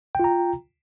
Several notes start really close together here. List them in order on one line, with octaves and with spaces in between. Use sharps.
G5 F4 A#5